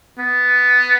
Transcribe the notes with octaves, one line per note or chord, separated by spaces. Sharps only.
B3